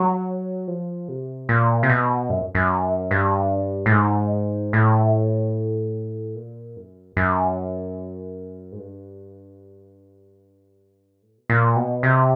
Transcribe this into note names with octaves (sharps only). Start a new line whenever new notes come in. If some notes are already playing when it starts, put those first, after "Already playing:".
Already playing: F#3
F3
C3
A#2
C3
B2
F#2
F#2
G2
A2
G#2
A2
A#2
F#2
F#2
G#2
G2
A2
B2
A#2
B2
C3